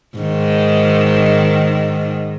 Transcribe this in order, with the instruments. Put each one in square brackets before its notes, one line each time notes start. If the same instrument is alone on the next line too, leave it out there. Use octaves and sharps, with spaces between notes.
[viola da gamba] G#2 D#3